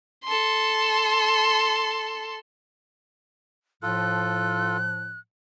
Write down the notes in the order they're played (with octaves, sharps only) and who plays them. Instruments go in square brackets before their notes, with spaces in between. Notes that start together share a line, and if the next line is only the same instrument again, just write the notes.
[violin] A4 C6
[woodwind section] A2 F3 [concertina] F4 A4 [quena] F#6